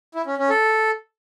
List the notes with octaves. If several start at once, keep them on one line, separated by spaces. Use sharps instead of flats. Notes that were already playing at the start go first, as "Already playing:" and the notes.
E4
C#4
C#4
A4